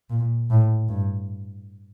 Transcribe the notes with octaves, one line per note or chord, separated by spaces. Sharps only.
A#2
A2
G2